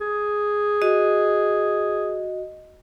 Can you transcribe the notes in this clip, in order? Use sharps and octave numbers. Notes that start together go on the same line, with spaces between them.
G#4
F#4 D#5